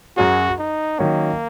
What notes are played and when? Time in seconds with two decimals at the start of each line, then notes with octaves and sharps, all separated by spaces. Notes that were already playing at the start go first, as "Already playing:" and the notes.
0.16 F#2 F#3 C#4 F#4 G#4
0.59 D#4
0.99 D#3 F#3 A#3 C#4